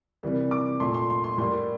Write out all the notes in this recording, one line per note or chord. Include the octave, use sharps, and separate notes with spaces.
C3 E3 G3 A#3
D6
A#2 A3 C6
C6
C6
C6
A2 G3 A#3 C6